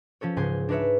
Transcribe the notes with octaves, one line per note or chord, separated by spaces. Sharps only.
F3 C#4 A4 C#5
C#2 G#2 C#3 C5 G#5 C6
D4 D#4 B4 C#5 E5